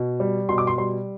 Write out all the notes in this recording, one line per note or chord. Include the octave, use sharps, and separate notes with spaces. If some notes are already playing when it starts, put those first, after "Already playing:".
Already playing: B2
G3
B2 C6
D6
C6
G3 C6